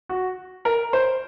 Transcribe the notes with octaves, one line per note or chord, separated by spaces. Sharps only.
F#4
A#4
C5